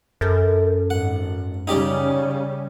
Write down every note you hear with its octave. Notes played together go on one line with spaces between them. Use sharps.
F#2 A4 A#4
G#1 F#5
C#3 G3 C#4 D#4 G4 D5